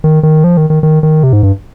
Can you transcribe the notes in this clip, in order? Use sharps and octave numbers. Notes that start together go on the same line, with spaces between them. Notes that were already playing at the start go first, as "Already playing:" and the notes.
D#3
D#3
F3
D#3
D#3
D#3
D#3
C3
G#2
G2